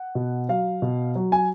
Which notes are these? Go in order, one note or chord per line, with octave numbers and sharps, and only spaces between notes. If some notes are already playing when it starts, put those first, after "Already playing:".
Already playing: F#5
B2
F#3 F5
B2
F#3
G#5